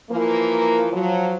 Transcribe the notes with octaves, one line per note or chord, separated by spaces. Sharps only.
E3 F3 A#3
F3 F#3